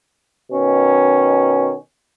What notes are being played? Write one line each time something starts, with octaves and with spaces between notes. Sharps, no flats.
B2 D#3 C#4